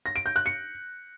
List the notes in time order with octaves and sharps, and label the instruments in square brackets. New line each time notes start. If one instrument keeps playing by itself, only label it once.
[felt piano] A#6
D7
G6
F#6
C#7